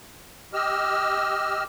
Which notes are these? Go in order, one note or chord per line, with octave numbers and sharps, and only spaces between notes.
G4 D#5 E6 F6